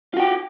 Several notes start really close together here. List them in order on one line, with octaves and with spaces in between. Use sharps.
F4 F#4 G5